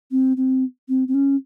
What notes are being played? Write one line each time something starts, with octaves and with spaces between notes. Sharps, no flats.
C4
C4
C4
C4
C#4